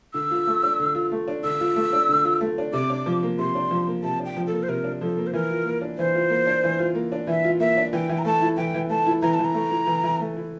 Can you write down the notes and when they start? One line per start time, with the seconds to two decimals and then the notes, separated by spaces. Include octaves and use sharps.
0.14 D3 E6
0.31 F4
0.47 A3
0.63 D4
0.79 D3
0.95 F4
1.12 A3
1.28 D4
1.44 D3 E6
1.60 F4
1.76 A3
1.93 D4
2.09 D3
2.25 F4
2.41 A3
2.58 D4
2.73 C3 D6
2.90 D4
3.06 F3
3.23 A#3
3.39 C3 C6
3.55 D4
3.71 F3
3.88 A#3
4.03 C3 A5
4.20 D4
4.25 G5
4.37 F3
4.47 A#3 A4
4.63 C5
4.68 C3 A#4
4.84 D4
5.01 F3 A4
5.17 A#3
5.27 C5
5.33 E3 A#4
5.50 F4
5.65 A#3
5.81 D4
5.98 E3 C5
6.15 F4
6.30 A#3
6.46 D4
6.64 E3
6.79 F4
6.95 A#3
7.12 D4
7.27 E3 E5
7.45 F4
7.60 A#3 E5
7.77 D4
7.93 E3 G5
8.09 E3
8.18 A#5
8.25 A3 A5
8.42 E4
8.57 E3 G5
8.74 E3
8.90 A3 A5
9.07 E4
9.22 E3 A#5
9.34 A5
9.39 E3
9.45 A#5
9.54 A3
9.71 E4
9.87 E3
10.04 E3
10.20 A3
10.37 E4